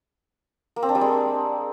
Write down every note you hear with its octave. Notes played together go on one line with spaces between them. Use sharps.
A#3
C4
D4
G3
G#3